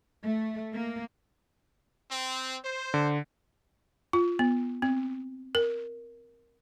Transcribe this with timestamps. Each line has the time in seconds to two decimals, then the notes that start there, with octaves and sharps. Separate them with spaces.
0.24 A3
0.74 A#3
2.10 C4
2.65 C5
2.94 D3
4.13 F4
4.39 B3
4.82 C4
5.55 A#4